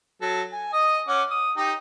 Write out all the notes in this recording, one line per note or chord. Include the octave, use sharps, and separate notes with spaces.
F#3 A4
G#5
D#5 D#6
C#4 F#5 D6
D#6
D#4 G4